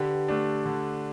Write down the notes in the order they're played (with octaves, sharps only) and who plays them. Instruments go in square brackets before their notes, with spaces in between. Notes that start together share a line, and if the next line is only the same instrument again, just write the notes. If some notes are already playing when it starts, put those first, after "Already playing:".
Already playing: [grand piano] D3 [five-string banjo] G4 B4
[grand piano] A3 D4
D3